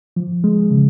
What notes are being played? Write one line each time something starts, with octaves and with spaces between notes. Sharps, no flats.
F3
G#3
C#3